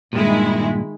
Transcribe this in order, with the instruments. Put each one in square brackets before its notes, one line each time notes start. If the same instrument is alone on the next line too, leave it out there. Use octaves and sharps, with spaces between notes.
[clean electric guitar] G2 A#2 [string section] D#3 G#3 E4